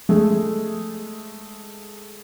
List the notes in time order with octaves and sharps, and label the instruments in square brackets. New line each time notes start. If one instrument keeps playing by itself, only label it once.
[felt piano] G#3 A3 G#4